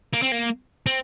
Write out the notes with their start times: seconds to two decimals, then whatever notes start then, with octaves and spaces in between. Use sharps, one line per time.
0.13 A#3
0.22 C4
0.32 A#3
0.86 C4